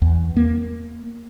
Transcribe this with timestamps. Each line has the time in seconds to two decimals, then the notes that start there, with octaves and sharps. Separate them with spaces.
0.02 E2
0.37 A#3